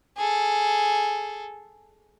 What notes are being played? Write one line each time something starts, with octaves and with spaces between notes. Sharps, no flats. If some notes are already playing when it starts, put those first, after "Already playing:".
G#4 A4